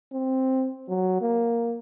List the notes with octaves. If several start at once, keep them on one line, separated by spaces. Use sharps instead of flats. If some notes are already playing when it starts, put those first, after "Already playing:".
C4
F#3
A#3